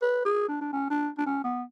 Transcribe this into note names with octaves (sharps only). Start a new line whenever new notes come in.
B4
G#4
D4
D4
C#4
D4
D4
C#4
B3